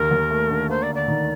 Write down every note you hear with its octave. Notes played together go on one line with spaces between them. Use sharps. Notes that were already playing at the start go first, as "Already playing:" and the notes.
Already playing: D#2 A#4
D#2
A3
D3
A#3 C5
D5
D2
D5
D#3